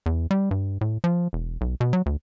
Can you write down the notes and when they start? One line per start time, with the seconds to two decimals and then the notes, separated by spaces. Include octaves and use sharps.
0.06 E2
0.31 G3
0.51 G2
0.81 A2
1.04 F3
1.33 E1
1.61 B1
1.81 B2
1.93 F#3
2.06 D2